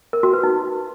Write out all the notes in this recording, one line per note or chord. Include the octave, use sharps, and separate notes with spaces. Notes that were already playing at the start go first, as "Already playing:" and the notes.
A#4
F#4
B4
D#4